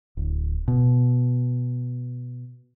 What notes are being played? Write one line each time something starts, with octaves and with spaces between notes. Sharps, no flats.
D1
B2